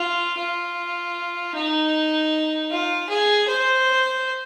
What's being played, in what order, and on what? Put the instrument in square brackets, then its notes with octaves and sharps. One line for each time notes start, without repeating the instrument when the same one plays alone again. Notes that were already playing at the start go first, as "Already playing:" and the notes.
Already playing: [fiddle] F4
F4
D#4
F4
G#4
C5